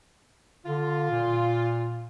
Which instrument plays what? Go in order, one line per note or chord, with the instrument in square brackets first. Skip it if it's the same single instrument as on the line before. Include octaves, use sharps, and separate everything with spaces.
[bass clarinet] D3 [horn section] F4
[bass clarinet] A#2